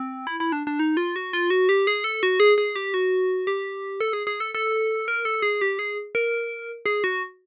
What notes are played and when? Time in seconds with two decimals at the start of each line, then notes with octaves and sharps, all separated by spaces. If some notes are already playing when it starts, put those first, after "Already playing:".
Already playing: C4
0.27 E4
0.40 E4
0.52 D4
0.67 D4
0.79 D#4
0.97 F4
1.16 F#4
1.33 F4
1.50 F#4
1.69 G4
1.87 G#4
2.04 A4
2.23 F#4
2.40 G#4
2.58 G#4
2.76 G4
2.94 F#4
3.47 G4
4.01 A4
4.13 G#4
4.27 G#4
4.40 A4
4.55 A4
5.08 A#4
5.25 A4
5.42 G#4
5.61 G4
5.79 G#4
6.15 A#4
6.86 G#4
7.04 F#4